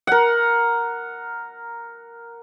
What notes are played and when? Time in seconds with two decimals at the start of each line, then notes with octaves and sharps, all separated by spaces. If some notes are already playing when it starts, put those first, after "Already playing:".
0.07 A#4 F#5